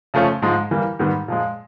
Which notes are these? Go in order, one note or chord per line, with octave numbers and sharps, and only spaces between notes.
C#3 F3 A3 C#4
G#2 F3 G#3
E3 G3 A#3
G#2 D#3 G3 B3
A#2 F3 G#3